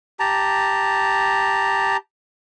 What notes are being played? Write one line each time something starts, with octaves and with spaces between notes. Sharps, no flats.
G4 A5 A#5